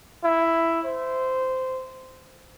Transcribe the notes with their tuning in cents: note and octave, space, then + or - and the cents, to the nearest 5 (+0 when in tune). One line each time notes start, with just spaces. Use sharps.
E4 +5
C5 -15